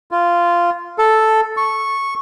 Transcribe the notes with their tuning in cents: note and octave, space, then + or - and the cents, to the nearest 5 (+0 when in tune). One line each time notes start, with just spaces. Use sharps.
F4 -10
A4 -5
C#6 -10